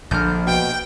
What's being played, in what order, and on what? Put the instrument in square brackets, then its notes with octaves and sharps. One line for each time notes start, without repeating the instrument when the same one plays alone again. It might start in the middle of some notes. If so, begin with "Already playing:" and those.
[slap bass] A#1 A#2 [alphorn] D3 [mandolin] F6 G6
[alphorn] B2 [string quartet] G5